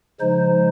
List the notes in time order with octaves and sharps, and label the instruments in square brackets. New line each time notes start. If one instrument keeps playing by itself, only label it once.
[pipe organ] C#3 F3 G#3 D#4 C5